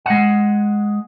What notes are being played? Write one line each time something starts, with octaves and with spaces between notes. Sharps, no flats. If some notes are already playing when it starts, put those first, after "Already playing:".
G#3 F#5